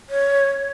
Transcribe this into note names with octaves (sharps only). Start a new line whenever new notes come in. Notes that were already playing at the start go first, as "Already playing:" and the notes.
C#5